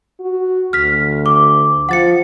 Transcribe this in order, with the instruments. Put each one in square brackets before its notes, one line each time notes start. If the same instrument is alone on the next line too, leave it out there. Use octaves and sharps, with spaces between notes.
[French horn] F#4
[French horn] D2 [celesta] F6 B6
[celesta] D6
[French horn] F3 [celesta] F#5 A6 C#7